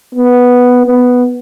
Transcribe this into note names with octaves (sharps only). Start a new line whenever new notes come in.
B3
B3